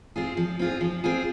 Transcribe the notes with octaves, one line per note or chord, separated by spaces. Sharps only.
C4 F4 G#4
F3
C4 F4 G#4
F3
C4 F4 G#4